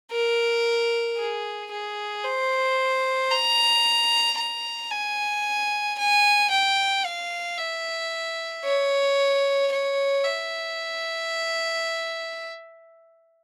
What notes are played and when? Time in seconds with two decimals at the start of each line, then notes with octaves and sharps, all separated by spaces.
0.11 A#4
1.18 G#4
1.71 G#4
2.24 C5
3.31 A#5
4.38 A#5
4.91 G#5
5.98 G#5
6.51 G5
7.05 F5
7.58 E5
8.64 C#5
9.72 C#5
10.24 E5